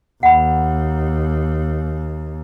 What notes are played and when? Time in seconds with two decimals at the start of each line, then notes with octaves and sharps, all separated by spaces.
0.23 D#2 F#5 B5